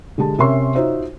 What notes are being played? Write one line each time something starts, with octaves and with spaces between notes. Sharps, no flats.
D3 G#3 G4 A5
C3 C#4 A#4 E5 C6 C#6
D#4 F4 F#4 C5 C#5 E5